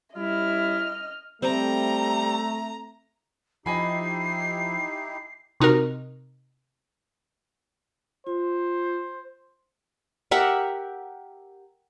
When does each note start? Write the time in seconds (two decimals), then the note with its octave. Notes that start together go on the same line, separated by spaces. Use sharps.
0.16 G3 C#4 E4 D#5 F6
1.42 G3 A3 C4 A#5
3.66 F3 D#4 E4 G4 D#5 G#5 B5 C7
5.60 C3 D#4 F#4 A#4
8.27 F4 C5
10.31 G4 A#4 E5 F#5